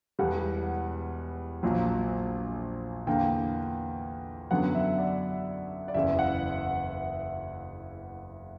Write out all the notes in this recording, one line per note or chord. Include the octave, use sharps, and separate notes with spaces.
E1 E2 B2 G3 F#5
A#1 A#2 F#3 A#3
E2 D3 A#3 G5
F#2 D3 F#3 B3 F#5
E5
D5
D5
F#1 E2 C#3 E3 E5
F#5